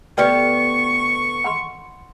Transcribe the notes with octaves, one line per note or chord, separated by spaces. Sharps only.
D2 B3 G4 B4 D5 G5 C#6
F#5 B5 C6